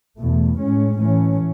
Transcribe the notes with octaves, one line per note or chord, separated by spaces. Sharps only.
E2 B2 A3
A2 G#3 C#4
A2 E3 A3 C#4